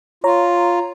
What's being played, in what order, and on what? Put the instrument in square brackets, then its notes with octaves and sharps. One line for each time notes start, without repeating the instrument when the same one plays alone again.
[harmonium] F4 [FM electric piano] C#5 A#5